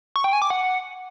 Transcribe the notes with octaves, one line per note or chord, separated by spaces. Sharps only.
C#6
G5
G#5
D6
F#5